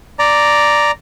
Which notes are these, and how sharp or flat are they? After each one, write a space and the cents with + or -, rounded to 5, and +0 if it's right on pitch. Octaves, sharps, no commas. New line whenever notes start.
D5 +0 A#5 +0